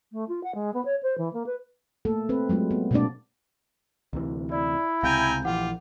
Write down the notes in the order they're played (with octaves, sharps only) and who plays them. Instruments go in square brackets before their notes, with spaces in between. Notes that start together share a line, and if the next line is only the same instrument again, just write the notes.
[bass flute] A3
F4
F#5
G#3
B3
C#5
C5
E3
A#3
B4
[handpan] A3 A#3 A4
C4 B4
F#3 G#3 A3 F4
B3
B2 G#3 A#3 C4 D4 D5
[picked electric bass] D2 C3 E3
[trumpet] E4 [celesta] D5
[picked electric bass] C#2 C3 [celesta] F5 G6 [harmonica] G5 G#5 A#5
[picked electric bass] A#1 E3 [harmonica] F4 [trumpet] G4 [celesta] F#5